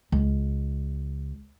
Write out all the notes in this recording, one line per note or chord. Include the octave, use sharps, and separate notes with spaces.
C#2